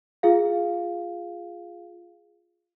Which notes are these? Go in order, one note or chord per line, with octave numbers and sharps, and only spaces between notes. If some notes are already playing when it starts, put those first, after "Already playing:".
F4 G#4 F5